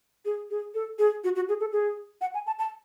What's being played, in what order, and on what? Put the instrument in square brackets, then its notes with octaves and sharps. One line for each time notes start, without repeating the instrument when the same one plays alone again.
[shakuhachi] G#4
G#4
A4
G#4
F#4
F#4
G#4
A4
G#4
F#5
G#5
A5
A5